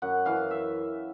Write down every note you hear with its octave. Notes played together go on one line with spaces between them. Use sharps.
F#2 F#5
E3 F5
E5